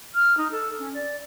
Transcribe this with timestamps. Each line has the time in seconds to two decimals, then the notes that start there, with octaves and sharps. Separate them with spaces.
0.15 F6
0.37 D#4
0.51 A4
0.79 C#4
0.94 D5